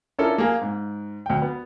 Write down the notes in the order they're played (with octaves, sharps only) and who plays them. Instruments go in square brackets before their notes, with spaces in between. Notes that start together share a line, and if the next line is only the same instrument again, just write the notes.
[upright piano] C#4 D4 E4 F4 A4 A#4
A#3 G#4 F5
G#2
D2 G5
B3